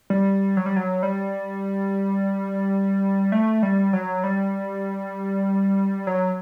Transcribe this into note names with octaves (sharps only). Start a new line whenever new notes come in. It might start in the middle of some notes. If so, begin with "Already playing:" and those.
G3
F#3
G3
F#3
G3
A3
G3
F#3
G3
F#3